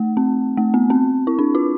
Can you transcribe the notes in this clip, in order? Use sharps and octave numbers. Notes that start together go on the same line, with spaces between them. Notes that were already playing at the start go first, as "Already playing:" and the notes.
Already playing: A3
C4
A3
B3
C4
E4
D4
F4